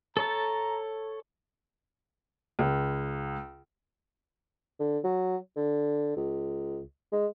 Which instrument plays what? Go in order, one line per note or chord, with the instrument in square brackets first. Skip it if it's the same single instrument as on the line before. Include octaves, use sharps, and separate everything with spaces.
[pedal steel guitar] A4 C#5 A5 [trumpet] A#5
[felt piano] C#2
[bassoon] D3
F#3
D3
C#2
G#3